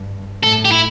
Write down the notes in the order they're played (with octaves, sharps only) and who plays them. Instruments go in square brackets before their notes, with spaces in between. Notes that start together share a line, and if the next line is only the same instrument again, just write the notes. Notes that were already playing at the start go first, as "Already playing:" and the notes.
Already playing: [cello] G2
[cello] A2 [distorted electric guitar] A4
[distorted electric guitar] G4
E4